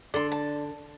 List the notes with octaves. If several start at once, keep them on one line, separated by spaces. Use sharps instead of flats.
D3 D4 A4 D5 C6
A5